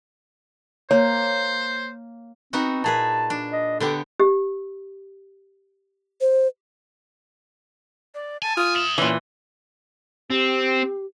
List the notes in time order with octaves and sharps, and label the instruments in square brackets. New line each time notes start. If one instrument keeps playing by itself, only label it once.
[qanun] A#3 [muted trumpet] C5 [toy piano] C#5
[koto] B3 D#4 F#4 [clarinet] C4
[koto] A#2 G#4 B4 [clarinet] A5
[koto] D4
[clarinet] D#5
[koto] D3 B3 G4 [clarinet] A4
[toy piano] G4
[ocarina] C5
[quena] D5
[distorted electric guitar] G#5 [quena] A5
[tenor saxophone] F4 [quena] D#6
[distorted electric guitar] B3 E5
[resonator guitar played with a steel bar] A#2 E3 [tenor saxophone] C#4
[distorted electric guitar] C4 [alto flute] G4